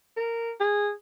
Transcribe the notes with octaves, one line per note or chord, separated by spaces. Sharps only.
A#4
G#4